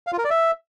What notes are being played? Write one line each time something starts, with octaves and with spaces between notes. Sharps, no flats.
F5
F4
A#4
D5
E5